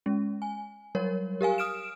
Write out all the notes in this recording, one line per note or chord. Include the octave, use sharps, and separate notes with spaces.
G#3 C#4
G#5
F#3 G3 A#4 C#5
G4 A#4 F5 G#5
D#6 F6 D7 E7